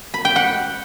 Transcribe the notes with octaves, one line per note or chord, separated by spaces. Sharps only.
B5
G5
F#5